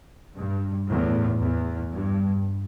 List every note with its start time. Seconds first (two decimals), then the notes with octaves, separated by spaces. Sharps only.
0.35 G2
0.87 E2 A2
1.40 E2
1.92 G2